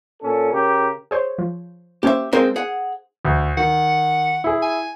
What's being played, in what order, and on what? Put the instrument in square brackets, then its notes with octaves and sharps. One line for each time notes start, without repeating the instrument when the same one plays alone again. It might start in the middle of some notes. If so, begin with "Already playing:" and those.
[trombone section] A#2 C#4 A4
C#3 G4 A#4
[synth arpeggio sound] G#4 C5 C#5
F3
[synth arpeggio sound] A#3 C#4 C5 [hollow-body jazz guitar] G4 E5
[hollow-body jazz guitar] G#3 A#3 C4 [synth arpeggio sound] D#4 A#4 C5
[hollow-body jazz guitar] G#4 F#5
[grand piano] D2
[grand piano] D#3 [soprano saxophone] F#5
[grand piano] E4 G#4
[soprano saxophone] G#5